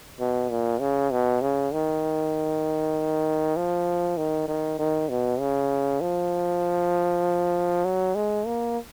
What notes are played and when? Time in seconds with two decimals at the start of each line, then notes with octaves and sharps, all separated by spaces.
0.19 B2
0.50 A#2
0.80 C#3
1.11 B2
1.42 C#3
1.73 D#3
3.56 F3
4.17 D#3
4.48 D#3
4.79 D#3
5.09 B2
5.40 C#3
6.01 F3
7.85 F#3
8.15 G#3
8.46 A#3